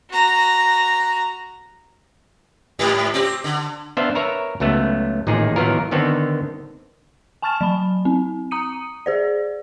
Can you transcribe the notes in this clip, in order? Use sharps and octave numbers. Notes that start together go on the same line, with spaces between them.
F#4 A#5
G#2 G3
C4 G4
D3
B3 D4 C5 E5 F5
A#4 B4 C#5 E5 A#5
C#2 F#3 A3 B3
A1 A#2 D#3 D#4 G#4
D#3 E3 F#3 B3 F4 A#4
D3 D#3 B3 C4 A4
G#5 A5 C#6 F6 A6 E7
F#3 B5
C4
A#5 D#6 C#7 D#7
G#4 C5 D5